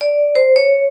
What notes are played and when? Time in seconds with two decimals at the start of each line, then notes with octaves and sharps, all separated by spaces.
0.01 D5
0.35 C5
0.56 C#5